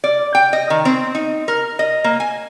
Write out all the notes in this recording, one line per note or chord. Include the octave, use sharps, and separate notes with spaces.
D5
G5
D#5
D#3
C4
D#4
A#4
D#5
A#3
G#5